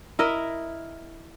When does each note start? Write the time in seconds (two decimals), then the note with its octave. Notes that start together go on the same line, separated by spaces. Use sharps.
0.19 E4 A#4 D#5 E5